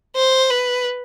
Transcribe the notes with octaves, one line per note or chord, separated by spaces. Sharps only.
C5
B4